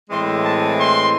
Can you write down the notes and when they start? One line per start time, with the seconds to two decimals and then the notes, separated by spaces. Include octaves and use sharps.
0.10 A2 E3 G#3 C4 C6
0.43 A5
0.78 C6